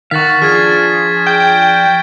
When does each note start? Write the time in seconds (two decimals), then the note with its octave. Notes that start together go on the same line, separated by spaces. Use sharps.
0.11 D#3 F5 F#5 C#6 A6 B6
0.42 F3 D4 F4 G#4 F6 G#6
1.27 G5 G6